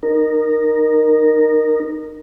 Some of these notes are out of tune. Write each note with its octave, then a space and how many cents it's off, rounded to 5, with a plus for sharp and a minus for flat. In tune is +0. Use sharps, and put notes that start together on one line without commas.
D#4 -20 A#4 +0